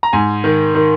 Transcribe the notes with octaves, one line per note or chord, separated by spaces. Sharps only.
A#5
G#2 G#5
D#3
D#3